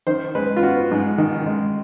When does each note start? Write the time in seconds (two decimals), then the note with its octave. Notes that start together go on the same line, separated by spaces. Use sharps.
0.07 D#3 C5
0.35 G#3 B4
0.57 F4
0.63 B3 F#4
0.91 G#2
1.18 D#3
1.46 G#3